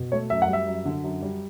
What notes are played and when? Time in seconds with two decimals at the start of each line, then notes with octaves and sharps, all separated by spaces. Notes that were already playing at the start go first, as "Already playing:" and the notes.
Already playing: B2
0.12 A3 C#5
0.30 F#2 E5
0.42 F#5
0.48 G3
0.53 E5
0.67 F#2
0.85 D3
1.04 F#2
1.22 G3